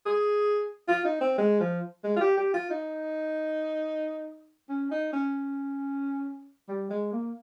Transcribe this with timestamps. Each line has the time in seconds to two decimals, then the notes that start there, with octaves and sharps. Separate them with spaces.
0.06 G#4
0.88 F4
1.05 D#4
1.21 C4
1.38 G#3
1.60 F3
2.04 G#3
2.16 F4
2.21 G4
2.37 G4
2.54 F4
2.70 D#4
4.69 C#4
4.91 D#4
5.13 C#4
6.68 G3
6.90 G#3
7.13 A#3